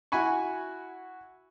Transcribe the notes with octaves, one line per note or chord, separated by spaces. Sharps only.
E4 F#4 G#5 B5 C#6